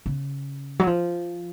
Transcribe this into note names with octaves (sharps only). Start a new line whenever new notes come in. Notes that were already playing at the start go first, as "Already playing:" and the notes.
C#3
F#3
F3